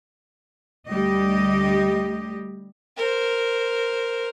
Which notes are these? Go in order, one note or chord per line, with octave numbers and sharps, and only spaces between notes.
D2 G3 G4 D#5
A#4 C5